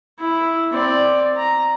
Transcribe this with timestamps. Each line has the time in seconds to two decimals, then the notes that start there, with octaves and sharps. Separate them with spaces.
0.19 E4
0.73 C4 D5
1.36 A#5